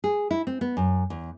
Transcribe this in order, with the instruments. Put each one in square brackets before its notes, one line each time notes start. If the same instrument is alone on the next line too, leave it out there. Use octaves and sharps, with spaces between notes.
[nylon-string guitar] G#4
E4
C4
B3
F#2
E2